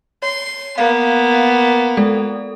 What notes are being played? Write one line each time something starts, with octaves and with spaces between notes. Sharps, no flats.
C#5 C6
A#3 B3 F5
G#3 A4